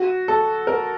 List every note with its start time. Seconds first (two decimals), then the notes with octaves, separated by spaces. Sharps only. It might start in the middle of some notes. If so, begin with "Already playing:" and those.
Already playing: F#4
0.28 A4
0.67 A#4